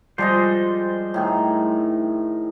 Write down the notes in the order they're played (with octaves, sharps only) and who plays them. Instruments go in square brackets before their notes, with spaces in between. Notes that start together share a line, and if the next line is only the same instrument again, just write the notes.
[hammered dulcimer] F3 G#3 D#5 [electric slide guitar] G3 C5
[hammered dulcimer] A2 D#3 G#4